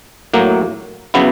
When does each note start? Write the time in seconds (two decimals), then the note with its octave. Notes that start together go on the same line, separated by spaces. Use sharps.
0.34 A2 F#3 A#3
1.14 C#3 F#3 B3 E4